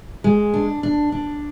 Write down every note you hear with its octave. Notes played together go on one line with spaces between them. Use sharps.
G#3
D4
D4
D4